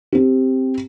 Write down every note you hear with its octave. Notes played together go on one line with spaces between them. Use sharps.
C4 G4